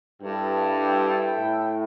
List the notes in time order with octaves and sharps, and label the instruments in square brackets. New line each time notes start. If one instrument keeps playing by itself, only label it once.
[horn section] G2 [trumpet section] E4 A4 E5 G5
[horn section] A2